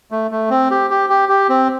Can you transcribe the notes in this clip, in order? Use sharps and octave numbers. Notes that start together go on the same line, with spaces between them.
A3
A3
C4
G4
G4
G4
G4
C4